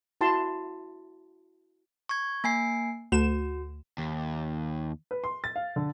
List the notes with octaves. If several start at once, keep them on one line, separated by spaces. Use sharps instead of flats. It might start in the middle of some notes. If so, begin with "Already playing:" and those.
E4 F#4 A5 C6
C#6 G#6
A#3 G#5 C7
D2 F#4 E7
D#2
B4
C6
A6
F5
D3